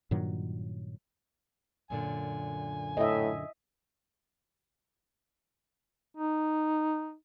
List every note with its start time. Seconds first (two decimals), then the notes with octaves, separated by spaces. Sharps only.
0.11 G2 A#2 D#3 F#3
1.90 F#2 A#2 D3 G#5
2.97 A2 D#5 E5
6.17 D#4